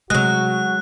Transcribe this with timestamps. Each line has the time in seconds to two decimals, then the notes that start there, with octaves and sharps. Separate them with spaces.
0.10 C3 F#3 G#3 E4 F#4 F#6